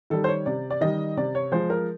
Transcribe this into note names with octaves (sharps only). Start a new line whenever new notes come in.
D#3 G3 A4
C5
C#5
C3 D5
D5
D#3 G3 D#5
C3 D5
C#5
F3 G#3 C5
A#4